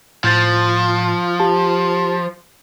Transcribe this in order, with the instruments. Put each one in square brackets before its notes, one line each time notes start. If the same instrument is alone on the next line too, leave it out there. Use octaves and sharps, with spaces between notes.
[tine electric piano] A2 G6 A6 [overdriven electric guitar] F3
[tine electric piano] G4 A5